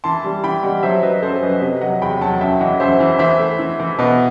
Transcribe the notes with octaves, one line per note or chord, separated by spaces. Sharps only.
E3 A5 C6
G3
E3 G5 B5
G3 D#5 F#5
F#3 C5 E5
F#3 B4 D#5
F#2 A4 C5
F#2 B4 D#5
C3 B4 D#5
F#3 D#5 F#5
E2 G5 B5
F#3 F#5 A5
F#2 E5 G5
E3 D#5 F#5
F#2 C5 E5
E3
E3 C5 E5
A3
E3
E3
B2 B4 D#5